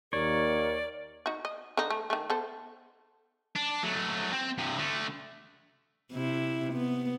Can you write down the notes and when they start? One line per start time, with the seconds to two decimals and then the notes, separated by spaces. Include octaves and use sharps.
0.13 D#2 A#4 C#5 D5
1.26 D#4 F#4
1.45 D#5
1.77 D3 D#4
1.90 A3
2.10 D#3 A3
2.30 B3 A4 C5
3.56 D4
3.83 F#3 A3
4.32 C4
4.58 G2 C3
4.77 D3 A3
6.12 C3 E4
6.73 B3